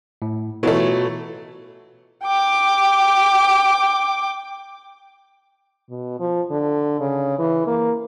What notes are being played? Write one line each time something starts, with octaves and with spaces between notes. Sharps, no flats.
A2
B2 E3 F#3 A3 F4 F#4
G5 D6
B2
F3
D3
C#3
E3
A#3